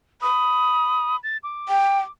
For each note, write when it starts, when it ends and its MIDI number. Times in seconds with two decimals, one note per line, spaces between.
0.22 1.16 83
0.22 1.16 87
1.23 1.37 93
1.43 2.11 86
1.69 1.99 79